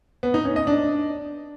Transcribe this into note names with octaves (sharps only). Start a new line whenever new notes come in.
B3
D#4
C#4
D#5
D4